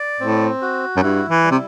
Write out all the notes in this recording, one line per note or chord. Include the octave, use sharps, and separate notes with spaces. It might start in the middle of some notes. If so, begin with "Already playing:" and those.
Already playing: D5
A2 C4
F#4
F#2
G2 E4
E3
G3
C3